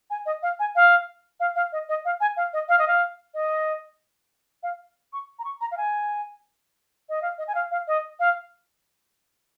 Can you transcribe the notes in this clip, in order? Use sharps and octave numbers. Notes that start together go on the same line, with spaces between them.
G#5
D#5
F5
G#5
F5
F5
F5
D#5
D#5
F5
G#5
F5
D#5
F5
D#5
F5
D#5
F5
C#6
A#5
C#6
A#5
F5
G#5
D#5
F5
D#5
G#5
F5
F5
D#5
F5